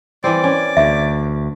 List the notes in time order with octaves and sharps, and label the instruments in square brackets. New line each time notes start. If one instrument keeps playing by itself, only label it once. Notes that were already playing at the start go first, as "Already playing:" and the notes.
[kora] E3 G3 C4 [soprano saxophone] D5
[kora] C#4
[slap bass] D2 [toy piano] E5